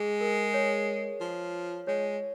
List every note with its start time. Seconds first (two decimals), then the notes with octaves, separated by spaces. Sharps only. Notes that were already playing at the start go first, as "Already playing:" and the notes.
Already playing: G#3 G#4
0.21 A#4
0.54 C#5
1.20 F3
1.87 G#3 C#5